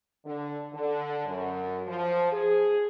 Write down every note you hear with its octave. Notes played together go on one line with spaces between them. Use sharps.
D3
D3
F#2
F3
G#4